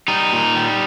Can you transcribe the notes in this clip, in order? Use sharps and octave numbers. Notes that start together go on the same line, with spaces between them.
G3 D#4
A#2
G3